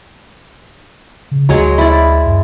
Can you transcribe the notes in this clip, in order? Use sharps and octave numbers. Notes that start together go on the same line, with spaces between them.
C#3
D2 F#3 G#3 C#5
E4 D5
F#2